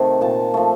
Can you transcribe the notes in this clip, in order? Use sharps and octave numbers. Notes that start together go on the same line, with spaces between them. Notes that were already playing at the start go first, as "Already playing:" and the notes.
Already playing: C3 D#3 A3
A#2 A5
F3 A3